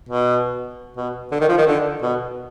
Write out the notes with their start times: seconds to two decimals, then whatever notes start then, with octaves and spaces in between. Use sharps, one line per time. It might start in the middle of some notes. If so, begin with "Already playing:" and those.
0.09 B2
0.97 B2
1.32 D3
1.41 D#3
1.49 F3
1.58 D#3
1.67 D3
2.02 B2